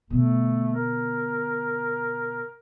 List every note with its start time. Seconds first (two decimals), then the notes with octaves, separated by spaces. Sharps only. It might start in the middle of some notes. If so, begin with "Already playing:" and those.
0.10 B2 D3 A3
0.74 A#4